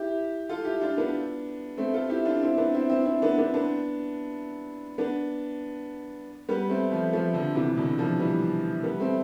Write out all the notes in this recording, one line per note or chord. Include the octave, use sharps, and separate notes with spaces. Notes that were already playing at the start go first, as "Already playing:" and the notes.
Already playing: E4 G4
F4 A4
E4 G4
D4 F4
B3 D4
A3 C4
F4 A4
E4 G4
D4 F4
C4 E4
B3 D4
C4 E4
C4 E4
C4 E4
B3 D4
B3 D4
B3 D4
B3 D4
G3 B3
A3 C4
F3 A3
F3 A3
D3 F3
C3 E3
B2 D3
D3 F3
E3 G3
G3 B3
A3 C4